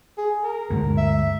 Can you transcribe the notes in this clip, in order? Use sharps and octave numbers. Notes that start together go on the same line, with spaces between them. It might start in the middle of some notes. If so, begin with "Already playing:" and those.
G#4
A#4
D2 G2 G#3
E5